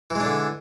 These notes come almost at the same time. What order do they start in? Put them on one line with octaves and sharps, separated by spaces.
E3 G#3 D4 D3